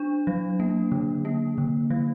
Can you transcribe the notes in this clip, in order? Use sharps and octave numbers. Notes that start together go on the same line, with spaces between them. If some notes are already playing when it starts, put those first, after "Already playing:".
Already playing: D4
F#3
A#3
D3
A#3
D3
F#3